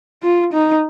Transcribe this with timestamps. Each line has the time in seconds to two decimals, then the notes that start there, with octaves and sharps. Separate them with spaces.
0.23 F4
0.53 D#4